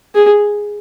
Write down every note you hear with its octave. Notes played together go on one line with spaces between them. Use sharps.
G#4